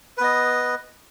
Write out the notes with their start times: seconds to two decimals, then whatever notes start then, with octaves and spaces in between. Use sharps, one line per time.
0.17 B4
0.21 B3
0.24 D#5